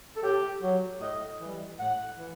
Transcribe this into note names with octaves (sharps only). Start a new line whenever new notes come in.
A4
A2 G4
F#3
A2 D#5
E3 G3
A2 F#5
E3